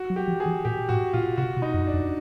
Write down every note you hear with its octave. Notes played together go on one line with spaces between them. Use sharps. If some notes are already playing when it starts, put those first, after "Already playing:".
Already playing: F#4
F#3
G4
F3
G#4
E3
A#2 G4
A2 F#4
A#2 F4
C3 F#4
B2
D#4
F#2
D4
F2